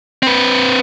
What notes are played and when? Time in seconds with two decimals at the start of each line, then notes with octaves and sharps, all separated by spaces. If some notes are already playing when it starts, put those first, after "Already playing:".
0.23 C4 B4